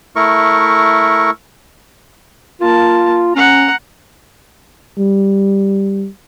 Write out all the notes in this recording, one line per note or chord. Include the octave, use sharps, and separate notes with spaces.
A3 E4 A#4 C#6
A#3 F4 A5
C#4 F#5 A#5
G3